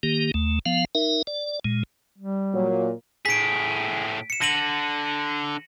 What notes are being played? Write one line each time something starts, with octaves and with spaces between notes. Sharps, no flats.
D#3 A#3 G4
D#2 A3
F3 B3 F5
D#4 A#4 E5
D5
A#2 G#3
G3
A#2 F#3 A#3
A2 G#4 B6 D7
C#7 E7
D3 A#6 D#7 F#7